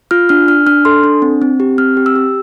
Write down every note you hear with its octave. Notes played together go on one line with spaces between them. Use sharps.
F4 F6
D4 F6
D4 F6
D4 F6
A4 C6
D4
C4
C4
G4
C4 F6
G4
E6
G4